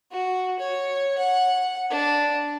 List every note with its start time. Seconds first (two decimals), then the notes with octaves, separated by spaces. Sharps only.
0.11 F#4
0.60 C#5
1.18 F#5
1.90 D4